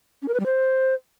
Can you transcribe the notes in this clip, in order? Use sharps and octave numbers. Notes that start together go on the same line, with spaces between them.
C#4
A#4
B4
G3
C5